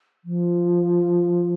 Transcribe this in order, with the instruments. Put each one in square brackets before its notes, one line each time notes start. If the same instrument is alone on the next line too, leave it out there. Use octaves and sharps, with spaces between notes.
[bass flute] F3